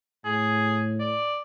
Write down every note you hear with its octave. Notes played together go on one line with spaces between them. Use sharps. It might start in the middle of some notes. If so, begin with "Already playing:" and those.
A2 G#4
D5